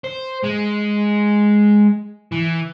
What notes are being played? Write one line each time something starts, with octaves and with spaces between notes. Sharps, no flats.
C5
G#3
E3